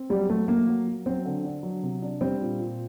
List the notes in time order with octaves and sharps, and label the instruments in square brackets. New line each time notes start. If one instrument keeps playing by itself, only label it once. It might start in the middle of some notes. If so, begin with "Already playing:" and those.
Already playing: [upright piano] C4
[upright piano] F#3 [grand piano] G3
[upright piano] F#3 [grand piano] A3
[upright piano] A3 [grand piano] A#3
[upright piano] F#3
F#3
[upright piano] F#3 [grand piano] C4
[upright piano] D3
D4
F#3
C3
D4
[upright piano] G3 [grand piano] C4
[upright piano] A#2
A#2